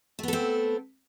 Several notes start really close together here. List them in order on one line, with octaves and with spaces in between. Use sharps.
A3 B3 A4 C4